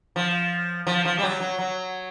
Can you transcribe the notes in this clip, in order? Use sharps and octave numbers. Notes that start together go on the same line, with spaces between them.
F3
F3
F3
G3
F#3
F#3
F#3